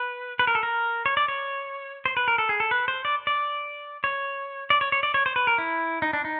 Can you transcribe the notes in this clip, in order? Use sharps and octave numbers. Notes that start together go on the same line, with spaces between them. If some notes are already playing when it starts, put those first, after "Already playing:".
Already playing: B4
B4
A#4
A4
A#4
C#5
D5
C#5
C5
B4
A#4
A4
G#4
A4
B4
C5
D5
D5
C#5
D5
C#5
C#5
D5
C#5
C5
B4
A#4
E4
D#4
D4
D#4